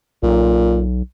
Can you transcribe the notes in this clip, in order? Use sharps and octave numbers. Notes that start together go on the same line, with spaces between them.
B1 A#2